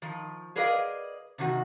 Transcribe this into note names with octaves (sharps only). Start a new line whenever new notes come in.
D#3 F3
G#4 A#4 B4 D5 D#5 F5
C3 D#3 F#4